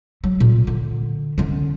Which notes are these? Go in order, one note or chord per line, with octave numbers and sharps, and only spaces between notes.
F#3
A#2
D3
D3 C#4